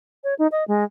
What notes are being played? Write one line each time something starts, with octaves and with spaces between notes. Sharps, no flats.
C#5
D#4
D#5
G#3